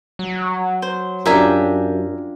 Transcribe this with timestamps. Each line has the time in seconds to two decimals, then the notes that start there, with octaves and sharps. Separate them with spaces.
0.19 F#3
0.82 C5
1.26 F#2 D4 F4 G4 A#4 E5 G#5